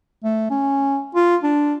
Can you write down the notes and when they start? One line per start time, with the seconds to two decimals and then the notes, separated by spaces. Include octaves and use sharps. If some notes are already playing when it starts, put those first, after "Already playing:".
0.24 A3
0.50 C#4
1.15 F4
1.43 D4